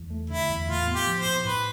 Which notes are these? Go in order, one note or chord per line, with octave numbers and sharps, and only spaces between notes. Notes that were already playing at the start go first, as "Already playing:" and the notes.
Already playing: E2
A3
D3 E4
E2
A2 F4
B3
G4
F3
C5
A2
A2 B4